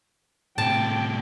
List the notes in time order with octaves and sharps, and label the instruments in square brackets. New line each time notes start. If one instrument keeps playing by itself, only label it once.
[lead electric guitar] A2 C3 [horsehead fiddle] G5 [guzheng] A5